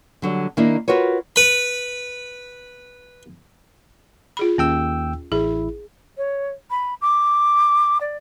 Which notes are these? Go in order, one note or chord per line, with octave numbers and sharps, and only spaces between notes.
D3 F#3 G3
D#3 A#3 D4 E4
F4 F#4 A#4 B4 C#5
B4 B5
F4 G#4 B5
D#2 C#4 G5 E6
A1 E4 G#4
C#5
B5
D6
D5